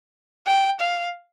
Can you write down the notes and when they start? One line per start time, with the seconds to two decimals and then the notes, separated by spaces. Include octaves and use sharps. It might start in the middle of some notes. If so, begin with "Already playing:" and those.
0.46 G5
0.80 F5